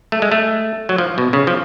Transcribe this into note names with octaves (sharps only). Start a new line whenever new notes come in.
A3
G#3
A3
F#3
F3
B2
C#3
F3